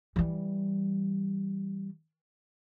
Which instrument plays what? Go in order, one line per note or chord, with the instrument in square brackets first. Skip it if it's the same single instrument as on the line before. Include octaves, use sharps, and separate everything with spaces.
[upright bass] E3 G3